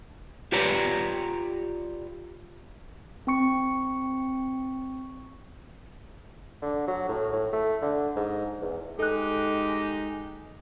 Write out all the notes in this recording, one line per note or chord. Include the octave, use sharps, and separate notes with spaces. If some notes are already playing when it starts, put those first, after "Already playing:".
F4 G4 B4 C#5 D5 A#5
C4 G5 C#6 C#7
D3
F#3
A2
A2
A3
D3
G#2
E2
G#3 D#4 G4 A4 F#6